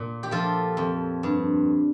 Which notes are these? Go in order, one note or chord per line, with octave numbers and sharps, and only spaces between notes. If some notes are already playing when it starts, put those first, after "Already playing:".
Already playing: A#2
G4
F3 F4 A4
F2
G2